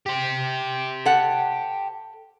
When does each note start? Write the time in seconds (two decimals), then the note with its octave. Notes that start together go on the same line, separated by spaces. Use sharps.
0.06 G4 C5
1.06 A4 F#5